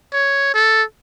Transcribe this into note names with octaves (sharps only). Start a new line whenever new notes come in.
C#5
A4